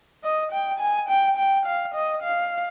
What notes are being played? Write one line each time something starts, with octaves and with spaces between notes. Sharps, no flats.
D#5
G5
G#5
G5
G5
F5
D#5
F5